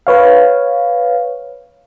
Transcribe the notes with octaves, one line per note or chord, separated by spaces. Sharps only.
B4 C#5 F5